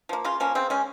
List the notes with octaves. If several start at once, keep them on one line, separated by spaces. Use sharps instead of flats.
F3 A#3
C#3 F4
F3 A#3 C#4
C#3 C4
G#3 C#4